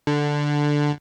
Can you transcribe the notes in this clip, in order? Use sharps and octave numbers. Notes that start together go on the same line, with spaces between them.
D3